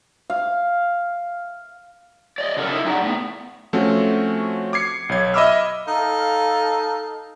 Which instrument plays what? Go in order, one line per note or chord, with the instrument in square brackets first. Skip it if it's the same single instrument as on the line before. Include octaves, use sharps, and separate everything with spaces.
[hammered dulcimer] F5
[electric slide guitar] D5 D#5
C#3 F#3 A4 A#4
D#4 E4
G3 D#4 G4 G#4 D5 F#5
A2 B3
[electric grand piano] F3 A3 C4 C#4 F#4
D6 G#6 C7 C#7
B1 C#5 G#6
D#5 E5 B5 D6 E6 F6
[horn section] D#4 A4 F5